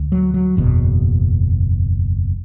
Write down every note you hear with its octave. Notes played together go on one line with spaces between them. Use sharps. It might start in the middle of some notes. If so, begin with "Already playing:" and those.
Already playing: D2
F#3
F#3
F#1 E2 B2